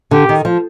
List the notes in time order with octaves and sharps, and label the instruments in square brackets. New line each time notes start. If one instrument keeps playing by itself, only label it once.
[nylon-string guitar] D3 [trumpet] G4
[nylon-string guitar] D#3
F3